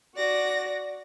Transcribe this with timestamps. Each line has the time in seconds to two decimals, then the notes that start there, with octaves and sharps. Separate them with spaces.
0.15 F#4 D5 A#6